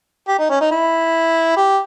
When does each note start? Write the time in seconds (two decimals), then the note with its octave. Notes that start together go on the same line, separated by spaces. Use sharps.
0.28 G4
0.39 D#4
0.50 C#4
0.61 D#4
0.71 E4
1.57 G4